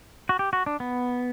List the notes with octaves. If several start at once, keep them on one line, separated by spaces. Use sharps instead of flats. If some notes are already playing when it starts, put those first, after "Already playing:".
F#4
G4
F#4
D4
B3